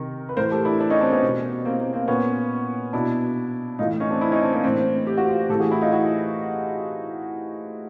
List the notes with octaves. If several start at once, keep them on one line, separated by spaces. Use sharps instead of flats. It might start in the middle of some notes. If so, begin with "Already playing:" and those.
Already playing: C3 D#3 A#4
B4
A2 E3 A#4 C5
G4 A4
D4 E4
D4 E4
C#4 D#4
C4 D4
B3 C#4
B2
A#3 C4
A#3
A#3 C4
A#2 B3 C#4
B2 D4 E4
A2 E3 D#4 F4
C#4 D#4
C4 D4
D4 E4
C#4 D#4
C4 D4
A#3 C4
A2 E3 C4 D4
G4
F#4
F4 G4
A2 E3 G4 A4
F#4 G#4
E4 F#4
D#4 F4
E4 F#4